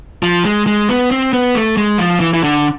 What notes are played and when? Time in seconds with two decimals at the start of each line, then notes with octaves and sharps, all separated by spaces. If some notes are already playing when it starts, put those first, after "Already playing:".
0.23 F3
0.45 G#3
0.67 G#3
0.89 B3
1.11 C4
1.33 B3
1.55 A3
1.77 G#3
1.98 F3
2.20 E3
2.33 E3
2.44 D3